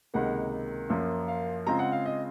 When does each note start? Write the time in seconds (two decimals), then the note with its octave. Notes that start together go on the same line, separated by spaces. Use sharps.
0.14 C#2 C3 D#3 A#3 F#5
0.90 F#2 F3 A#3 F4
1.28 F5
1.67 C#3 G#3 C4 F4 A#5
1.79 F#5
1.92 F5
2.06 D#5